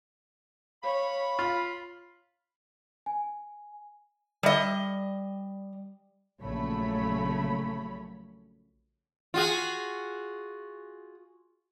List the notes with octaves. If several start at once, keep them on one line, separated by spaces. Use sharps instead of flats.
C#5 F5 B5
F4
G#5
G3 D#5
A#1 C#3 F#3 A3 C#5 B5
F4 F#4 G#4